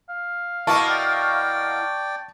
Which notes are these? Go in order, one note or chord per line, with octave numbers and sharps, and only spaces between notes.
F5
B2 A#3 E4 A5 C#6
D5 G5